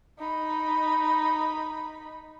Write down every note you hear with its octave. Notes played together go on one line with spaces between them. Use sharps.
D#4 B5